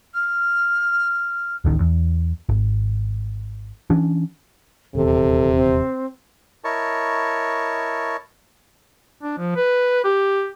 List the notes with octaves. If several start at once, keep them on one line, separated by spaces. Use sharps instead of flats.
F6
D1 A1 D#3
E2
G#1
E3 C#4 D4
D#1 E2 C3 A4
C4
E4 A#4 C#5 D#5 A5 C#6
D4
F3
B4
G4